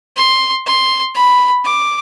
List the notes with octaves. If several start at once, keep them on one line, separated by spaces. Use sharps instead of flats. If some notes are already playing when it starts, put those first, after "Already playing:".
C6
C6
B5
D6